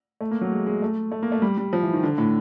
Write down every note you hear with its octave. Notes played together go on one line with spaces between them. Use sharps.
A3
A#3
F#3
G#3
G#3
A3
A3
A#3
A3
G3
G3
F3
E3
D#3
D3
A2